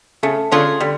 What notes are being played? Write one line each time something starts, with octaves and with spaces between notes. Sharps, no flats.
C#3 A3
D3 C#4 F4 G#4
D3 G3